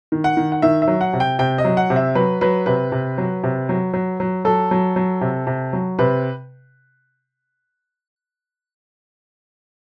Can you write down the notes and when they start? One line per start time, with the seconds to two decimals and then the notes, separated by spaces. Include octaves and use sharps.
0.12 D#3
0.24 F#5
0.37 D#3
0.52 F#5
0.62 D#3 E5
0.82 E5
0.88 F#3
1.01 F#5
1.13 C3
1.20 G5
1.39 C3 G5
1.58 D#5
1.65 F#3
1.77 F#5
1.90 C3
1.96 E5
2.15 F#3 B4
2.41 F#3 B4
2.66 C3 B4
2.92 C3
3.18 F#3
3.43 C3
3.69 F#3
3.93 F#3
4.20 F#3
4.45 F#3 A4
4.71 F#3
4.96 F#3
5.21 C3
5.47 C3
5.73 F#3
5.99 C3 B4